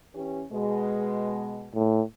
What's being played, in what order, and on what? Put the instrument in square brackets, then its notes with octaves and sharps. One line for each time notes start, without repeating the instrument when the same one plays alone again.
[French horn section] E3 C#4 G4
B2 G#3
[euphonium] A2